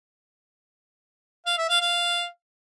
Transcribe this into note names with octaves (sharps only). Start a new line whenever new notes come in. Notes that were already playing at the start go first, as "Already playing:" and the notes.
F5
E5
F5
F5